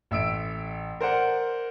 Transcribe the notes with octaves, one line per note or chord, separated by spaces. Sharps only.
A1 E5 E6 D7
A#4 C5 D5 F#5